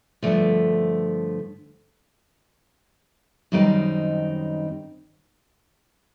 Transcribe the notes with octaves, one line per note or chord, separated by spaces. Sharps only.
G2 D3 F3 A3
F#2 D#3 G3 C4 D#4